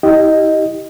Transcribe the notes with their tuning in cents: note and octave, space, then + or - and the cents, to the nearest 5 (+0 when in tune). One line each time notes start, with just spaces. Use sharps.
E4 -45 G4 -15 D#5 +0